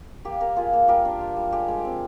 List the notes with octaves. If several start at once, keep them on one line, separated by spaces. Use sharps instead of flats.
A#3 G4
A#3 G4 A#4
A#3 F4 G#4
A#3
G3 G4 A#4
D4
F4
G3
G#3 G4
G#3
C4